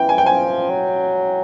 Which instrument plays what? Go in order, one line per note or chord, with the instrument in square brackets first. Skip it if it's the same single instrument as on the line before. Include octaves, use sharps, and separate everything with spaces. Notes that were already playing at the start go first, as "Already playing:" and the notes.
Already playing: [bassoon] E3 [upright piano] G5
[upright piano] G#5
G5
[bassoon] F3 [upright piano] G#5
[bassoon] F#3